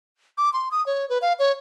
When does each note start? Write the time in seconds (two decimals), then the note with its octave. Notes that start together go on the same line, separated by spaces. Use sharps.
0.38 D6
0.53 C6
0.71 D#6
0.86 C#5
1.10 B4
1.22 F5
1.39 C#5